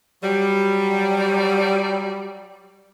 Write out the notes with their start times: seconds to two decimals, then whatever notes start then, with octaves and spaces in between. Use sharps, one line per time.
0.23 F#3 G3